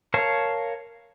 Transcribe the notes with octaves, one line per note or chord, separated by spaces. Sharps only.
A#4 C#5 F5 A5